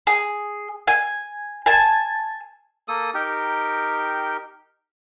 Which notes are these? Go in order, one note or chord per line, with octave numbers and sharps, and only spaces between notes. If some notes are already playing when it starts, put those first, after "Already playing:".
G#4
G#5
G#5 A5
A#3 A4 D#6
D#4 G4 A#4 G5